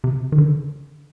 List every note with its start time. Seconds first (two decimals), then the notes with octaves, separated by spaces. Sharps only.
0.04 C3
0.32 D#3
0.38 D3